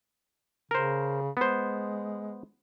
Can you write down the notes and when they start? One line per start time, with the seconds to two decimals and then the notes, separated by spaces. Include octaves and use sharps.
0.71 C#3 A#4 C5
1.37 G#3 B3 C5